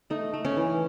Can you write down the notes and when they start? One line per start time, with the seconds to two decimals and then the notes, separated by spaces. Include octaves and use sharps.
0.10 A3 D#4
0.34 A3
0.45 C#4
0.57 E3